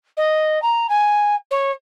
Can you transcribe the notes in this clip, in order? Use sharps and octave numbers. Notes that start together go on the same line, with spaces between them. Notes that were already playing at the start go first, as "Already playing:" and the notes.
D#5
A#5
G#5
C#5